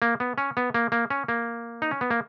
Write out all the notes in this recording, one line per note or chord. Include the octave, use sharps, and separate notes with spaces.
A#3
B3
C#4
B3
A#3
A#3
C#4
A#3
D#4
C#4
B3
A#3